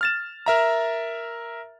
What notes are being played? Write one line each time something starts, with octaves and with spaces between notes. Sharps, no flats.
F6 A6 E7
A#4 E5 A#5